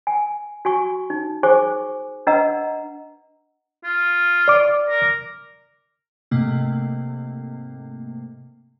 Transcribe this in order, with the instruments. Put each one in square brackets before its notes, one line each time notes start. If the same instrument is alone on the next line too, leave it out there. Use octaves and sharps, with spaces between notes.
[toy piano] G#5
F#4 G#5 C#6
D#4
G#4 C5 G#5 C#6 D6
D4 B4 D#5 F#5 A#5 E6
[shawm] F4
[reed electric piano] D5 D6
[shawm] A#4
[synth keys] G#2 C3 A3 A#3